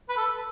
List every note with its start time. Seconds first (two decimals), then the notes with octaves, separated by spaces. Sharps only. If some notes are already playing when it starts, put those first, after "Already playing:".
0.09 B4
0.17 A4